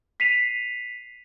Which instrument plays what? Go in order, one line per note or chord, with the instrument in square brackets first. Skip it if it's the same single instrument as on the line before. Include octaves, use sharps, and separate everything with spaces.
[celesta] B6 C7 D#7 F7